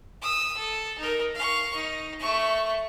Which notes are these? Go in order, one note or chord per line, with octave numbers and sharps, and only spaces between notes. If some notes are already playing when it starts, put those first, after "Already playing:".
D#6 E6
A4
D#4 A#4
F5 C#6
D#4
A3 C#6